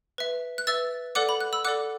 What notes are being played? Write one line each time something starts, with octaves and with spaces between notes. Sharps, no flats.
B4 E5
F#6
B4 E5 E6 A6
A4 D5 F#5 D6 F#6
B5
F#6
B5 E6
A4 D5 F#5 D6 F#6